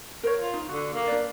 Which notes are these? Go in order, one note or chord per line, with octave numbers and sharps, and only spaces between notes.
A#4 C5 C#5
F4
D#4
D3 F#4
A#3
D4 B4 D5